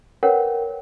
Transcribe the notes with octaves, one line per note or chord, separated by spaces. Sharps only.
A#4 B4 C#5 F#5 G5